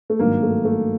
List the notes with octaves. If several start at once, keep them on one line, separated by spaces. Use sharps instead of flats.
A3
G#1 G2 D#3 F#3 A#3
A3
A3